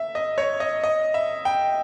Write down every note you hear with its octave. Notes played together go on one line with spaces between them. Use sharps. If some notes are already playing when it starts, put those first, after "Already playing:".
Already playing: E5
D#5
C#5
D#5
D#5
E5
G5